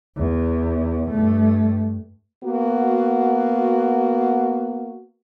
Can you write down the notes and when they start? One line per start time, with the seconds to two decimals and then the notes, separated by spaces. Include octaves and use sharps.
0.16 E2
1.09 G2 A3
2.44 A#3 B3 F#4